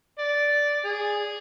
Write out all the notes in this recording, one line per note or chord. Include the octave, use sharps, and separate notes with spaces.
D5
G#4